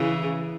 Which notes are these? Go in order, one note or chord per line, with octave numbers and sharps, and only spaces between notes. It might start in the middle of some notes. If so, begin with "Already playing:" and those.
Already playing: C#3 E3